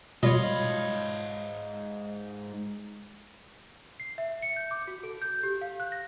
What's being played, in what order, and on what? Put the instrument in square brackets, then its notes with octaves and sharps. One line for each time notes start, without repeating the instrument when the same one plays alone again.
[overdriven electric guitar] G#2 B5 [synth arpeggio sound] B2 G3 [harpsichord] F4 C#5 [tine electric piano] D#5
[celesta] C7
E5
C#7
G6
D6
F#4
A4
G6
G4
F5
F#6
A#6